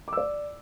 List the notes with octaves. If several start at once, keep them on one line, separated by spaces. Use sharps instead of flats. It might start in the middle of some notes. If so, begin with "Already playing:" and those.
D5 D6 E6